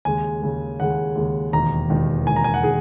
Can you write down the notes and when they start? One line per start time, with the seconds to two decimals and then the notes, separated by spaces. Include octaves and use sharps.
0.05 D#2 C#3 G#3 G#5
0.42 D#2 C#3 G#3
0.80 D#2 C#3 G#3 F#5
1.16 D#2 C#3 G#3
1.52 E1 D#2 D#3 A#5
1.90 E1 D#2 D#3
2.26 E1 D#2 D#3 G#5
2.36 A#5
2.44 G#5
2.54 F#5
2.63 D#3 G#4